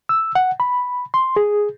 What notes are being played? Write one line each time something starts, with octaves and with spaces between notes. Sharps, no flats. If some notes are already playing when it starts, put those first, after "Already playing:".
E6
F#5
B5
C6
G#4